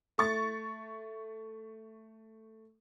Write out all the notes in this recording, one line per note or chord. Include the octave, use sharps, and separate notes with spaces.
A3 C#6 A6